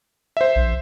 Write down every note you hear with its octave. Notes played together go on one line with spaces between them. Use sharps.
C5 E5
A#1